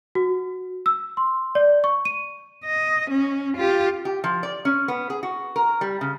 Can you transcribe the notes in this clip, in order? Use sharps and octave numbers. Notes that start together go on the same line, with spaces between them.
F#4
E6
C6
D5
C#6
D#7
D#5
C#4
F4 G4
G4
F3
D5
C#4
B3
G#4
F#4
A#4
G3
C#3